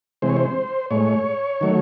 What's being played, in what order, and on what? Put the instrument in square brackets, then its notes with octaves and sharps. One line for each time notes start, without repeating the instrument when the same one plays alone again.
[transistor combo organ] C3 E3 G#3 C5
C#5
C5
A2 G#3 C#5
D#3 F#3 A3